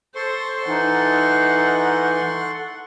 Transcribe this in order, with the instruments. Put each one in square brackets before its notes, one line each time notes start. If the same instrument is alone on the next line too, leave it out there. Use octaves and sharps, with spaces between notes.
[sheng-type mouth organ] A4 C6 C#6 [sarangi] C5
[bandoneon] E3 [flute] D#4 [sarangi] F#5